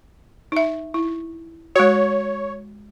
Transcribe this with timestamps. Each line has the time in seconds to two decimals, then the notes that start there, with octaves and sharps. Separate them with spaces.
0.52 D#4 E5
0.94 E4
1.76 G#3 F#4 C#5